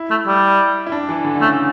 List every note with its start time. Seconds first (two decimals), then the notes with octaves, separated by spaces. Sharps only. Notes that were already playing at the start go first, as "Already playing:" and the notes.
Already playing: E4
0.10 A3
0.27 G3
0.87 E4
0.92 D4
1.09 E3
1.24 D3
1.35 D3
1.41 C#3 A3